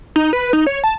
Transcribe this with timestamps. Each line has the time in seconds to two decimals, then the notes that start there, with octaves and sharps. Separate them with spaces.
0.16 D#4
0.33 B4
0.53 D#4
0.67 C#5
0.84 A5